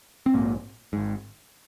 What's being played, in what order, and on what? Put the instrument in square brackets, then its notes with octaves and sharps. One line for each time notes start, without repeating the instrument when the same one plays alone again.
[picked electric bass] C4
A#1 G#2 A#3
G#1 G#2